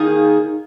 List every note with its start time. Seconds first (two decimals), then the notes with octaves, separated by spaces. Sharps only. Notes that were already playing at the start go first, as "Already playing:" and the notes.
Already playing: D#3 A#3 D#4 G#4